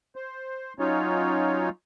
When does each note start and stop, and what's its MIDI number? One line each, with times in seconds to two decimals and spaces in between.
0.16 0.73 72
0.79 1.69 54
0.79 1.69 61
0.79 1.69 63
0.79 1.69 65
0.79 1.69 73